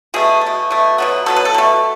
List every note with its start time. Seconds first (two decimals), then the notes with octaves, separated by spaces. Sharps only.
0.14 B2 A3 G#4
0.41 A3
0.46 B2
0.71 B2 A3
0.98 B2 F#3 B3
1.26 B2 F#3 B3 A4
1.36 B4
1.45 A4
1.54 B2 A3